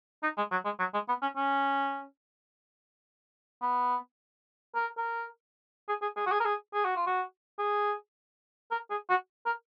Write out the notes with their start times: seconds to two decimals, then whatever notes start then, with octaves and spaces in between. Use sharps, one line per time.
0.23 D#4
0.38 G#3
0.52 F#3
0.65 G#3
0.80 F#3
0.94 G#3
1.09 B3
1.22 C#4
1.37 C#4
3.62 B3
4.75 A#4
4.98 A#4
5.89 G#4
6.02 G#4
6.17 G#4
6.27 F#4
6.32 G#4
6.40 A#4
6.45 G#4
6.74 G#4
6.84 F#4
6.96 F4
7.07 F#4
7.59 G#4
8.72 A#4
8.91 G#4
9.10 F#4
9.46 A#4